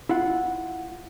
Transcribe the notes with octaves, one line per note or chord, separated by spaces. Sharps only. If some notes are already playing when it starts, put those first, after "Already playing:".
E4 F4 F#5